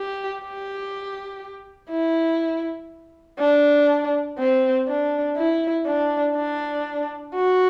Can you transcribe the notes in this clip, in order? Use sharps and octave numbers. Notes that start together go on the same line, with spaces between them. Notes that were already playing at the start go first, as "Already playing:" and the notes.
Already playing: G4
G4
E4
D4
C4
D4
E4
D4
D4
F#4